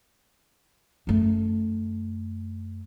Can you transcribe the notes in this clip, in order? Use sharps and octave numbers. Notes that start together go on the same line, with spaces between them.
F#2 A3